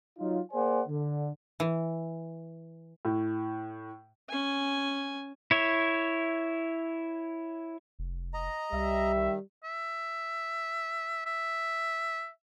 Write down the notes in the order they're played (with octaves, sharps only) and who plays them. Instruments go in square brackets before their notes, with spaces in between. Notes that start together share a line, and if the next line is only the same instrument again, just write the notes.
[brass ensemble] F#3 D#4 F4
A#3 G#4 C5 D5 F#5 G#5
D3
[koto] E3
[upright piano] A2
[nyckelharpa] C#4 G#5
[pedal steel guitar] E4 C#5 E5
[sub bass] F1
[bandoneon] D#5 A#5
[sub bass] C2 [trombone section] G3 [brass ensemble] E5
[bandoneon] D#3
[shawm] E5
E5